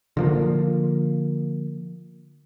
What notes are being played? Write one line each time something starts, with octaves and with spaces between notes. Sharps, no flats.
D3 F3 A#3